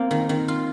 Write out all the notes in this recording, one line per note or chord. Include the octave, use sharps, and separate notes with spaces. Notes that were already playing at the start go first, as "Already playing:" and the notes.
Already playing: A#3 C4 F4
D#3
D#3
F4